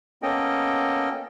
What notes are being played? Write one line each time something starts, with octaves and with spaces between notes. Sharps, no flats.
A#3 B3 C#4 A4 D#5 G5